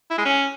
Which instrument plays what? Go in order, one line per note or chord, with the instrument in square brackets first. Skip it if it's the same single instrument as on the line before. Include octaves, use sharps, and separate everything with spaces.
[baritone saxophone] E4
G#3
C#4